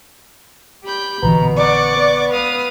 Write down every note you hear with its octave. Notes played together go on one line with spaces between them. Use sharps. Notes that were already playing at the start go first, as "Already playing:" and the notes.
G4 B5 G6
A#1 B2 D3 E3 B3 A#5
D5 F#5 C#6 D6
B3
B4 F5 D#6